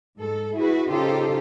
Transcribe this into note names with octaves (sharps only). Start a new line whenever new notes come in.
G#2 G#3 A4
E4 F#4 G#4 B4
C#3 D#4 F4 G4 A4 C5